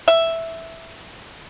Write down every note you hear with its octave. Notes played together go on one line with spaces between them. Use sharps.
E5